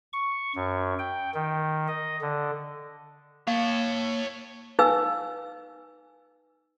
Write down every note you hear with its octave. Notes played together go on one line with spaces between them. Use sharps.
C#6
F#2
G5
D#3
D#5
D3
A#3 C#5 F5 A5
D#4 B4 F5 G#5 E6